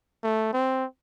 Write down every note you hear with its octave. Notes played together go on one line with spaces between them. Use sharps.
A3
C4